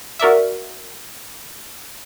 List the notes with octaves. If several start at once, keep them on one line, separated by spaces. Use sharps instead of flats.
F#4 A#4 D5 E5